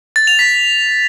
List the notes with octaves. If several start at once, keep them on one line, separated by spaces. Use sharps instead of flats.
A6
F7
B6